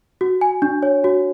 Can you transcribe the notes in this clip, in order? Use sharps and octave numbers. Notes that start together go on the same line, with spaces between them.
F#4
G#5
D4
C#5
F#4